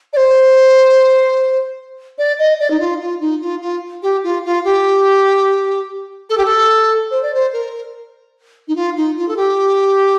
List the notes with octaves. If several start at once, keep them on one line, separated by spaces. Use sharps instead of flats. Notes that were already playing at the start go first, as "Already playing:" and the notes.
D5
C5
D5
D#5
D5
D#4
F4
F4
D#4
F4
F4
G4
F4
F4
G4
A4
G4
A4
C5
D5
C5
A#4
D#4
F4
D#4
F4
A4
G4